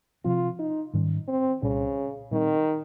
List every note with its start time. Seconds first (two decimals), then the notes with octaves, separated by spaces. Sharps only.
0.24 C3 F3 C4 F4
0.59 D#4
0.93 G#2 D#3 G3 C#4
1.28 C4
1.62 C2 A#2 C#3 G3 C#4
2.31 A#2 D#3 G3 C4